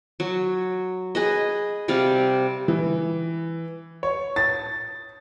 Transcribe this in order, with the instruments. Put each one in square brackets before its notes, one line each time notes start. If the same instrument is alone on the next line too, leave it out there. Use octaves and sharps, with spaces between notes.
[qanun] F#3
G#4 B4 D#5
C3 G3 D5 F5
[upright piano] E3
C#5
A6